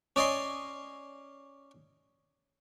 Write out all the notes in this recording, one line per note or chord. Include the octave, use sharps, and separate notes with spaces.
C#4 D5 D#5 G#5 C6